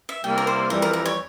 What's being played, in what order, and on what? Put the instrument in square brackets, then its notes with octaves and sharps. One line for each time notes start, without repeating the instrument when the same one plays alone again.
[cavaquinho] E5
[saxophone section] C3 G3 A#3 E4 [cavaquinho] G5
[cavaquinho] A#4
C5
[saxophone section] F2 E3 G3 [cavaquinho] A#4
[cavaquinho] A#4
A#4
C#5